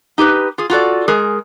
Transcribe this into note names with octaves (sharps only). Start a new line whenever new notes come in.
D#4 G4 G#4 B4
F4 G#4
F4 F#4 A4 D5
G#3 G#4 A#4